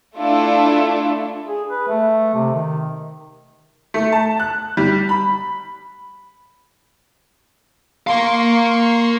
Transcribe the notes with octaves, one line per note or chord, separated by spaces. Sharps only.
A3 D4 E4 F4 A4
G#4
B4
A3
C3
D#3
A3
A5
F#6
G3
B5
A#4 F5 C6 C#6